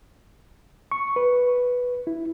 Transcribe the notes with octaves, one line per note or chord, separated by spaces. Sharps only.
C#6
B4
E4